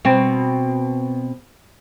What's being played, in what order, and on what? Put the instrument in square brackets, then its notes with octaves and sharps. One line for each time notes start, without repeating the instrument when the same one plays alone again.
[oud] B2 C4